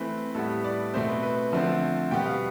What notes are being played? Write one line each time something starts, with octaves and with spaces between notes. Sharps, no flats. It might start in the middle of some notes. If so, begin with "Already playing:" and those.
Already playing: E3 A3 C4 B4
A2 G3 B3 A4
D5
B2 A3 C4 C5
B4
B4
D3 F3 A3 C4
B2 G3 B3 G5
F5